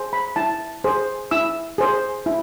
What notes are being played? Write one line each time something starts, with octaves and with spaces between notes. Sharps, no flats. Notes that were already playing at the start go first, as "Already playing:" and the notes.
Already playing: G#4 C5
B5
E4 A5
G#4 C5
E4 E6
G#4 C5
E4